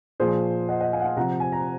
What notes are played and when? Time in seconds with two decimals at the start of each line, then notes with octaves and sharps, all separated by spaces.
0.20 A#2 F3 G#4 C5
0.69 D#5 F#5
0.80 D#5 F#5
0.93 F5 G#5
0.99 F#5
1.04 F5 G#5
1.17 C3 F3 F#5 A#5
1.40 G#5
1.52 A#5